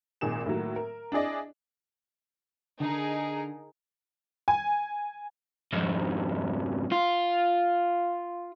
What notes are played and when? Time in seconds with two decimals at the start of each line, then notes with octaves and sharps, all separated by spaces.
0.21 G#1 A#2 D#3 G#4 E7
0.46 A2 D#3 F#3 A#3
0.76 A#4
1.12 D4 E4 G#4 D5 D#5
2.80 D3 D#4 G#4 A#4
4.48 G#5
5.73 F2 G#2
6.92 F4